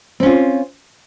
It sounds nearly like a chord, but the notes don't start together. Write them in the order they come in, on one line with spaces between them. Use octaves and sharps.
C4 C#4 F4